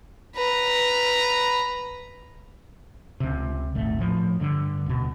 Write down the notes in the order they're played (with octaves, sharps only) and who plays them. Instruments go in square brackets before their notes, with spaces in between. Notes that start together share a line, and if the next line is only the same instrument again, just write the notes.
[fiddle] B4 A#5
[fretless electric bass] C#2 C3
D#1 G#1 A3
A2 F3
G2 D3
D#1 B2